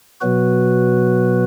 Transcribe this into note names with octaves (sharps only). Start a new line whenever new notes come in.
B2 F#3 B3 F#4 B4